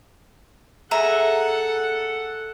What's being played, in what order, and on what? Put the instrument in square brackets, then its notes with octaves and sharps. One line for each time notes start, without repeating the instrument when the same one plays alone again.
[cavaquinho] G#4 E5 A#5 [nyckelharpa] A4 F#5